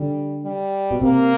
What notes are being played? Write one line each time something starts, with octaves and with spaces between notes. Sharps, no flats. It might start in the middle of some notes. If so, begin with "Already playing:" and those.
Already playing: D3 G3
G3
B2
C3 A#3